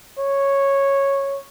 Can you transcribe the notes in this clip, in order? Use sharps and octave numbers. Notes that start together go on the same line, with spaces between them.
C#5